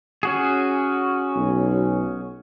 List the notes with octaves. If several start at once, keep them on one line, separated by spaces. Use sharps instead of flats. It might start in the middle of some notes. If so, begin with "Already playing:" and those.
C#4 F#4 G#4
B1